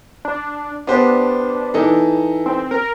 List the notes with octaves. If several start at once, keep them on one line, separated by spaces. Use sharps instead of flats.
D4
B3 D4 G4 C5
E3 D#4 A4
C4
A#4